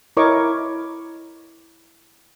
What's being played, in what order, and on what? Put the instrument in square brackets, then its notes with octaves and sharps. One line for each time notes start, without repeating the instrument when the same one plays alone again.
[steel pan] E4 A#4 C#5 D#5 C#6 D6